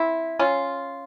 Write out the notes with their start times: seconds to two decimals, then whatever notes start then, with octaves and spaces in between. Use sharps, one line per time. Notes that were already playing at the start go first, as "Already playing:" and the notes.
Already playing: C4 E4
0.39 C#4 F4